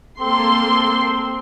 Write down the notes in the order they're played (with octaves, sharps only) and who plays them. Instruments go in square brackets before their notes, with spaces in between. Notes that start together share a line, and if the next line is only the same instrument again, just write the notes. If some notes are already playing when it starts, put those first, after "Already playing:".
[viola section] A#3 A4 C6 [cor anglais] C4